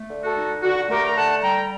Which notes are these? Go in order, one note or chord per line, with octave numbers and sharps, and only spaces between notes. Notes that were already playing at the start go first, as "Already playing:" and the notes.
Already playing: A3
D3
F#4 A4
D#4
D3 F#4
A3 G4 A#4
A#5
D3 F#5 A5
G3 G5 A#5